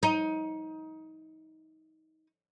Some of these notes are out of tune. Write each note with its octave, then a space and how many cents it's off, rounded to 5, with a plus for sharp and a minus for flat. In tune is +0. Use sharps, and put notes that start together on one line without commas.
D#4 +25